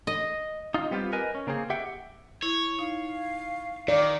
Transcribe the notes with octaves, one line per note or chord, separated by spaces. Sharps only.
D#5
D#4 F4
G3 B3 C4 F4 G4
A#4 B4 D#5 G#5
C#4
C#3 A#3 C4 C#4 G#4
G4 E5 F#5 G5
E4 C#5
D#4 F5
D#3 D5 F5